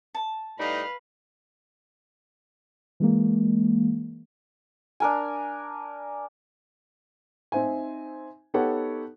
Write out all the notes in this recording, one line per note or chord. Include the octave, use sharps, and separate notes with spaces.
A5
A2 G3 D#4 B4 F5
E3 G#3 A#3
D4 A#4 G#5
C4 D#4 C5 E5 G#5
B3 D#4 G4 A4 C#5 F#5